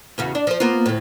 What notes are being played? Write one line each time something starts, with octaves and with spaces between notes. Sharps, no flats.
E2 C#3 F#4
D4
F3 C5
A#3 B3 F4
D2 A2